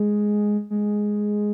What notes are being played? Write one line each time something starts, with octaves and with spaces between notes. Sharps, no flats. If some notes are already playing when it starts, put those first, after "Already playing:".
Already playing: G#3
G#3